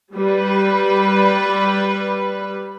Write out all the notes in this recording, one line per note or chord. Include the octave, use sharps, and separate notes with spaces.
G3 B4